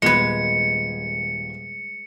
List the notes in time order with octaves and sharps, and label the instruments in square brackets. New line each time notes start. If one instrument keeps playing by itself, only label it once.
[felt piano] D#1 B3 G#6 [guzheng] G#3 B4 [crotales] C#7